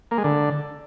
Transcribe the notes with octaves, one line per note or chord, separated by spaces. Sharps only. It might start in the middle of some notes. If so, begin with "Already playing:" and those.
A#3
G#3
D3